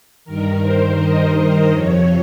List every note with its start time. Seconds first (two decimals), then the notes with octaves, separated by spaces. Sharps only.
0.25 G2 D#3 A#4
0.62 C5
0.98 D#5
1.72 F2 C3 F3 C#5